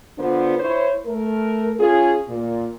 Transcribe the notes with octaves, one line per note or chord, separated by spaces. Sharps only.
D3 B3 D4 F4 C5
E4 C5 C#5
A3 A#4
C#4 F4 G#4
A#2